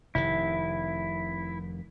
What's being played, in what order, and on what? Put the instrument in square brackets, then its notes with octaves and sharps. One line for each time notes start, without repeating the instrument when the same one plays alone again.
[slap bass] F1 C3 D#3 [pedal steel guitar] E4